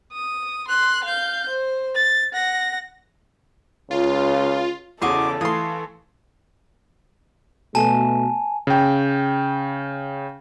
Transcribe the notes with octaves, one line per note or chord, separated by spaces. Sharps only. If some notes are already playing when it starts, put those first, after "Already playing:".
D#6
C6 F#6
F5 G6
C5
A6
F#5 A#6
C#2 F4
E2 C#3 F#4 A4 D#5 C6 D6
E3 A3 F5 C6 D#6
B2 A3 G#5 A5
C#3 G5